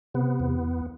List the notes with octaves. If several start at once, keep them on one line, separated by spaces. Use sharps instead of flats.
C3 B3
E2